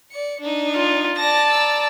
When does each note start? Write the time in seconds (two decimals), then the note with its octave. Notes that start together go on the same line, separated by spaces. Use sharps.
0.12 D5 C#7
0.40 D4 D#4
0.76 F4
1.18 D5 A5 A#6
1.50 A#5 E6